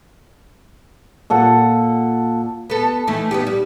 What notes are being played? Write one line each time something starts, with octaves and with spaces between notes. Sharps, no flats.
A#2 A4 F#5
B3 A4
E3 A3 D#4
B3 D#4 G4
G3